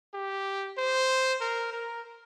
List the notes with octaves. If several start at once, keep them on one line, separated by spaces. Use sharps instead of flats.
G4
C5
A#4
A#4